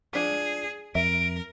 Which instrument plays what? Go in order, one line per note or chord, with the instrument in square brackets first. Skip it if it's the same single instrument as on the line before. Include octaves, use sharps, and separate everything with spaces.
[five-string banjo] F3 D4 F4 [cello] G#4
[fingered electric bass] F2 [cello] A#4 [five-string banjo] E5 [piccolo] D7